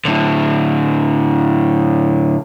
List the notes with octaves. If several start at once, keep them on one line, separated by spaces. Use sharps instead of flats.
A2 D3